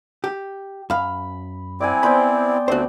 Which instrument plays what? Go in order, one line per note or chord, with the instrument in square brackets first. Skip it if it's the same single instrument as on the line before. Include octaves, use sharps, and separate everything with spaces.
[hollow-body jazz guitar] G4
[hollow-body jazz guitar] F#2 F5 [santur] B5
[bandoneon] C4 E4 [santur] D5 F#5 G#5
[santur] B3 C5 G5 [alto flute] D5 [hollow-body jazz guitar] B5
[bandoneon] D2 A3 C4 [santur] B3 [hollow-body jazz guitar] F#4 C5